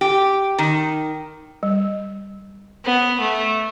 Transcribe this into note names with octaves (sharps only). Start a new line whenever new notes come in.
G4
D#3
G3
B3
A3